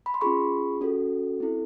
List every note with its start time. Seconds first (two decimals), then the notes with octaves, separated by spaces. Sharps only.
0.06 B5
0.14 C6
0.21 C#4 F4 G#4 B5 C#6
0.81 C#4 F#4 A4
1.40 C4 E4 A4